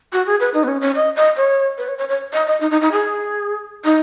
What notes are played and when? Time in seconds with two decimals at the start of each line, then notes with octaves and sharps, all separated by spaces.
0.13 F#4
0.26 G#4
0.40 B4
0.54 D#4
0.64 B3
0.68 C#4
0.81 C#4
0.95 D#5
1.16 D#5
1.37 C#5
1.78 B4
1.88 C#5
1.98 C#5
2.09 C#5
2.33 D#5
2.47 D#5
2.61 D#4
2.71 D#4
2.81 D#4
2.92 G#4
3.85 D#4